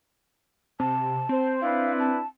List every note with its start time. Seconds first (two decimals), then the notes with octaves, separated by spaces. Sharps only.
0.80 C3 A5
1.29 C4 C5
1.61 D4 E4 B4 F5
2.00 A5